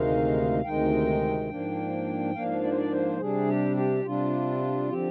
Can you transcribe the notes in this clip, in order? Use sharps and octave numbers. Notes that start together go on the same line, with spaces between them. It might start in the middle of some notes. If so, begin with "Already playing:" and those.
Already playing: D2 C3 D#3 G#3 D#4 F5
D2 C3 D#3 G#3 D#4 G5
G#2 F3 A#3 D4
G#2 F3 A#3 D4 F5
D5
C5
D5
C5
C3 G3 D4 G#4
G4
G4
C3 G3 D4 F4
D3 F3 C4 G4